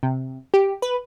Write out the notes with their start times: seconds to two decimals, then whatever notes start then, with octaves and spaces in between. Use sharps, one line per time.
0.03 C3
0.54 G4
0.82 B4